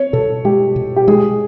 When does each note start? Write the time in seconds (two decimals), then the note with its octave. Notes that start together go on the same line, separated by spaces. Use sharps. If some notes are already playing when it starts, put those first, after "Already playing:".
Already playing: C4 C#5
0.13 B2 A4
0.45 G#3 G4
0.76 B2
0.96 G4
1.08 G#3 G#4